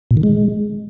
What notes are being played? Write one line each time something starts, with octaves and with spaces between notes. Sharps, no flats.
A#2
D#3
G#3